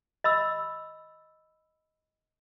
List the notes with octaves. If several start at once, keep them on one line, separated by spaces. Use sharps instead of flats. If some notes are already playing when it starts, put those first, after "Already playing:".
D#5 B5 E6